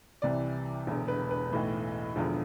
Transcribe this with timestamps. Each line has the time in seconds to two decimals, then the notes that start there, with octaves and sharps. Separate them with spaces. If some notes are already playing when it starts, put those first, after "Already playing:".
0.22 C2 C3 E3 D5
0.87 E1 E2 D3
1.08 B4
1.31 B4
1.52 B1 A2 E3
2.16 E1 E2 D3 F3